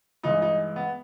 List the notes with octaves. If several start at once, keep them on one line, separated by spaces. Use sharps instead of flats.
G2 E3 G#3 D#4
D#4
B3